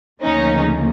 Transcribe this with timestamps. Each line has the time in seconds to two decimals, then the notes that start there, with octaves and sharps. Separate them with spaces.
0.22 D2 C#3 F3 A#3 C#4 D#4